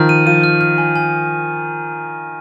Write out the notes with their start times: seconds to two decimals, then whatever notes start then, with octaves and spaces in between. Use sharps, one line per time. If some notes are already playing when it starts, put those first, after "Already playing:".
Already playing: D#3 F3 F6
0.09 D#7
0.26 F3 D#7
0.43 F6
0.61 F6
0.78 G#5
0.96 G#5